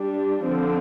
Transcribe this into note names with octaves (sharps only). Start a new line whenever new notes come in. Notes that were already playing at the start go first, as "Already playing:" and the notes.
Already playing: G3 D4
D3 F3 C4